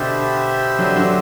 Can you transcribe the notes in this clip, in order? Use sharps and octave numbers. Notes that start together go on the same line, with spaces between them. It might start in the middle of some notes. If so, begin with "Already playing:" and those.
Already playing: B2 D3 G4 C5 E5
D3 F#3
D3 F#3